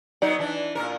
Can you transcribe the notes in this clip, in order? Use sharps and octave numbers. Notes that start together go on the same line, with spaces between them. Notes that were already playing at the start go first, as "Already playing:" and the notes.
F#3 B3 D#4 D5
E3 D4
A#2 C#3 A#4